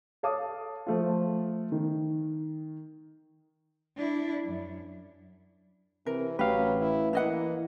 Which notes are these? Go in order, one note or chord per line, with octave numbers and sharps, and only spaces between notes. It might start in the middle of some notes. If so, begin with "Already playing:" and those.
A4 C#5 F5 A5 D6 D#6
F3 A3 F4
D#3
D4 E4
F#2
C3 E3 A#4
A1 F#3 G4 B4 F5
E4
E3 A#3 E4 D#5 F#5